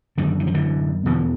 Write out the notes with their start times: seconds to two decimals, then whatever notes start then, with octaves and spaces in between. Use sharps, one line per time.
0.18 F#2 D3 D#3
0.40 E3
0.47 F3
0.54 D3 E3
1.06 E2 B2 D3 E3